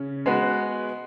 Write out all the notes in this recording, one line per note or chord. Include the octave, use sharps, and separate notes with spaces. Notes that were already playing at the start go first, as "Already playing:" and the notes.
Already playing: C#3 C#4
G#3 B3 F#4 B4